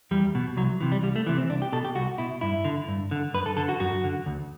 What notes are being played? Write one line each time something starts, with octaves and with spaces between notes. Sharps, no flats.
E2 G3
B2
C2 F#3
C3 E3
G3
C2 G3
A3
C3 E3
C4
C2 D4
G4
B2 A4
G4
C2 F#4
B2 E4
G2 E4
D3
G2
D3
F#2 B4
A4
D3 A4
F#4
F#2 F#4
D3
D2